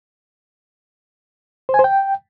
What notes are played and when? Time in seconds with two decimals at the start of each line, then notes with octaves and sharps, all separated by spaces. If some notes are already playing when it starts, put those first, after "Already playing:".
1.69 C5
1.74 G#5
1.79 C5
1.84 G5